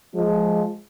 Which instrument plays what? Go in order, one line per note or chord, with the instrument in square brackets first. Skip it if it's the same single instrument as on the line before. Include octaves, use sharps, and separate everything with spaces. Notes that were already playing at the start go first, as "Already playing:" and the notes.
[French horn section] F3 G#3